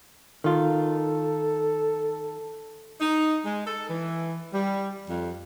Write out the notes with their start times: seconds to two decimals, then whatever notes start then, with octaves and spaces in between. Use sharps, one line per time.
0.44 D#3 F4 A4
3.01 D#4
3.45 G#3
3.66 A4
3.90 E3
4.54 G3
5.08 F2